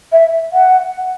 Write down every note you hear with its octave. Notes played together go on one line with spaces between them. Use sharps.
E5
F#5